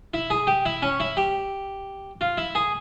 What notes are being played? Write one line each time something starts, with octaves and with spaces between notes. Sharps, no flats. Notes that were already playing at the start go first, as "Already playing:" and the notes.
E4
G#4
G4
E4
C#4
E4
G4
F4
E4
G#4